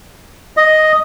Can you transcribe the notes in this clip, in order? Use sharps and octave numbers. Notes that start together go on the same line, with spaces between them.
D#5